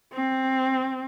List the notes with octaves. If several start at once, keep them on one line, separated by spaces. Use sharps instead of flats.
C4